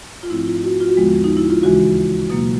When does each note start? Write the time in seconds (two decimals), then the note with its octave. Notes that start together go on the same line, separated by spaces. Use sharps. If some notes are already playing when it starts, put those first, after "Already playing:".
0.23 F4
0.30 G#2 F3 A3 C4 E4
0.47 F4
0.64 F#4
0.80 F4
0.88 F#4
0.97 D#2 D3 F3 G#3 B3 F4
1.24 D#4
1.37 E4
1.50 F4
1.63 D2 C#3 E3 G#3 F#4
2.30 B2 F#3 A#3